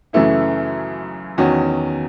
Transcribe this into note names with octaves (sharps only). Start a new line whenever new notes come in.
F#2 C#3 E3 A3 E4
E2 D#3 F#3 C#4 F#4